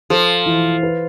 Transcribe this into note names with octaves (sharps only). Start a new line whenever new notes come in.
F3 A4
E3
B4